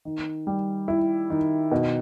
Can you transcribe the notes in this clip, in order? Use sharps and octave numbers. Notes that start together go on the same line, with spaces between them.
D#3
G3
E4
D#3
B2